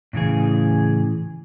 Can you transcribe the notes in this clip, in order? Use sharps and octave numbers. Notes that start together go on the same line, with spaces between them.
A2 C#3 E3 G#4